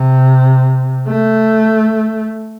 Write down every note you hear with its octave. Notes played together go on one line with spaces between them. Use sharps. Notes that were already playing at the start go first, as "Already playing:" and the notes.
Already playing: C3
A3